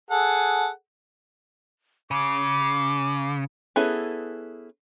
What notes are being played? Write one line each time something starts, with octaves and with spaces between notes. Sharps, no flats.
G#4 A4 F#5
C#3 D6
B3 C#4 E4 G#4 A4